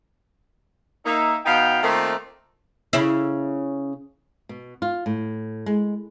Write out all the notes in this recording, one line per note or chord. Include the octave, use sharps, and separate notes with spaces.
A#3 D#4 E5
B2 B3 D#4 F5 G5
D#3 A3 A#3 C4 D#4 F4
C#3 E4
B2
F4
A2
G#3